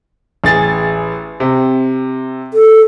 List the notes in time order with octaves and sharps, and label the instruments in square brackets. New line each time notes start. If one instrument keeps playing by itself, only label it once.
[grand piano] A1 G#4 A6
C3
[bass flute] A4